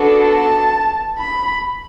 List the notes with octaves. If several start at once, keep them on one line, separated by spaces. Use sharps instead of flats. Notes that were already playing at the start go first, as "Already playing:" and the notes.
Already playing: B3 D4 F#4 A4
A5
B5